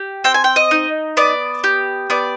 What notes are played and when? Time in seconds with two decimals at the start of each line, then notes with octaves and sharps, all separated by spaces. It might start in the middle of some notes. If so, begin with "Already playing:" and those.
Already playing: G4
0.24 C4 G5
0.34 G#5
0.44 G5
0.56 D#5
0.71 D#4
1.17 B3 D5
1.64 G4
2.10 B3 D5